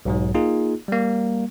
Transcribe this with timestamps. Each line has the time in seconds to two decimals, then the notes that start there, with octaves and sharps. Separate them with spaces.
0.05 B1 G#2 F#3
0.34 A#3 D#4 F4 G#4
0.88 G3 A#3